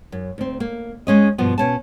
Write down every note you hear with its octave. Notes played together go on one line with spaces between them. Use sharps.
F#2
D2 C4
A#3
G#3 C#4 D#5
G2 B2 F3 B3
B2 C#4 A5